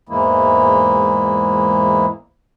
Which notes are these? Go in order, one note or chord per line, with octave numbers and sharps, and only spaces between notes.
E2 G#2 E3 G#3 A#3 E4